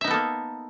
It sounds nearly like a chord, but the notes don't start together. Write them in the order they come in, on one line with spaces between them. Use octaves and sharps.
E5 D#4 B3 A4 A#3